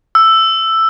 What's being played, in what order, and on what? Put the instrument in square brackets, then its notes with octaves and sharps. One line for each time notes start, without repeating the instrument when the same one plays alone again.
[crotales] E6